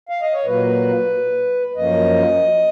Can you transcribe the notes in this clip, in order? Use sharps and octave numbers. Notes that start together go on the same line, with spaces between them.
F5
D#5
C#5
A#2 F#3 A#3 B4
F#2 F3 A#3 C#4 D#5